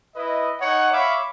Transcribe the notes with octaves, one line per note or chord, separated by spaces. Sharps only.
E4 B4 D#5
D#4 C#5 F#5
C#5 E5 F5 B5 D6